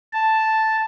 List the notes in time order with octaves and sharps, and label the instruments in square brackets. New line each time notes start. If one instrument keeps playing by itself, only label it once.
[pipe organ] A5